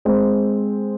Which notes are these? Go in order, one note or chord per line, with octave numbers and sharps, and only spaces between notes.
G#3 C4